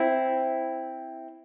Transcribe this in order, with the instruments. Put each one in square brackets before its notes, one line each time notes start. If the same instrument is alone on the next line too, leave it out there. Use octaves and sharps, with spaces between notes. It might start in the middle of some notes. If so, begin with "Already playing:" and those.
Already playing: [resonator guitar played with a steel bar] C4 E4